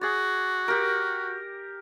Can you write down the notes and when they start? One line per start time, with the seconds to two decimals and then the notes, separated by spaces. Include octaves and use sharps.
0.01 F#4 G#4 D5
0.68 G4 A#4